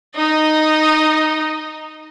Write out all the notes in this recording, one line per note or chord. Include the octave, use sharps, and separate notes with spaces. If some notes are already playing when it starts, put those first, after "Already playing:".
D#4 D#5